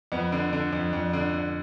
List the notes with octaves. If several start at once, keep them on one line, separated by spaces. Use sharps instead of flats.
F2 B3
D3
D3
F2
F2
D3
D3